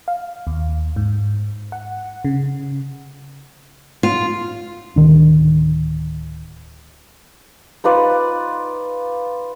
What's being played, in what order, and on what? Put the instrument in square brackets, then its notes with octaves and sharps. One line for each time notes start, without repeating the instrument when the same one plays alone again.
[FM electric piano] F5
D#2
G#2
F#5
C#3
[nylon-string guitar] F4
[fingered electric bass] D1 D#3 D4
[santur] D#4 F4 B4 D5